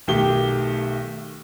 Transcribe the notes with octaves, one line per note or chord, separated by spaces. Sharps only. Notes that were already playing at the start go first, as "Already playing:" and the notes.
B1 D#3 A3 G4 G7